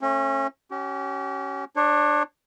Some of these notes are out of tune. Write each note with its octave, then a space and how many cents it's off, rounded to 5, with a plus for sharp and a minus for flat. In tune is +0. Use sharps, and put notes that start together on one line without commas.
A3 +15 C#4 -30
C#4 +0 G4 -40
D4 +15 C#5 -25